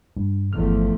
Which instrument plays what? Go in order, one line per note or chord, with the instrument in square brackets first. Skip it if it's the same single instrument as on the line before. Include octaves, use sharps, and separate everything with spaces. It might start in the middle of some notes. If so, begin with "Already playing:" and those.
[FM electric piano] G2
[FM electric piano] G1 F6 [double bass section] E2 F3 A3